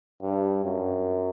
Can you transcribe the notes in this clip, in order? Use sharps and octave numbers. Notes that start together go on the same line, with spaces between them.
G2
F#2